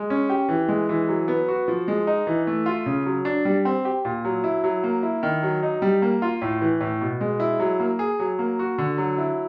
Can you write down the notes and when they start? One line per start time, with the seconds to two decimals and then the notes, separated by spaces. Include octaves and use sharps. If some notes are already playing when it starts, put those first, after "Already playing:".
Already playing: G#3
0.10 C#4
0.29 G4
0.49 E3
0.68 G#3
0.89 E3
1.08 F#3
1.28 B3
1.48 F#4
1.68 F3
1.88 G#3
2.07 D#4
2.27 E3
2.47 A3
2.66 F4
2.86 C#3
3.06 F#3
3.25 D4
3.45 G3
3.65 C4
3.85 G4
4.05 A#2
4.25 F#3
4.44 E4
4.64 F#3
4.83 A#3
5.03 E4
5.23 D#3
5.43 F#3
5.63 D#4
5.82 G3
6.02 A#3
6.22 F4
6.42 A2
6.61 E3
6.81 A2
7.01 B2
7.21 G#3
7.40 E4
7.60 F#3
7.80 A#3
7.99 G#4
8.20 F#3
8.39 A#3
8.59 F#4
8.78 D3
8.98 F#3
9.18 E4